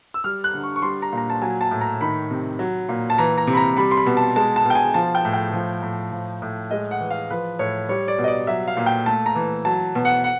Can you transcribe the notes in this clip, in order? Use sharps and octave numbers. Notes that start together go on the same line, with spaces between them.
E6
G3 F6
F#6
D3
C#6
C#6
G3 C6
A#5
A#2 A#5
A5
F#3 G#5
A5
A2
A#5
D#3 B5
C3
F#3
A#2
A5
E3 A#5
A#5
C3
B5
A#5
G3 B5
C6
B5
B2
A5
G#3 A5
A5
B2
G5
G#5
F3 A5
G5
A2
G5
F3
A2
F3
A2
G#3 D#5
F#5
E3
F5
F3 B4
A2 C#5
G3 C#5
D5
B2
D#5
D5
F#3 E5
F5
A#2
G5
A3 A5
A#5
E3
F#3 A5
B2
F#5
F#5